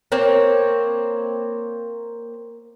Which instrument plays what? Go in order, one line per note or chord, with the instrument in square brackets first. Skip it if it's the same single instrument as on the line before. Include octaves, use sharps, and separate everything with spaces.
[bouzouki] A#3 C4 C#5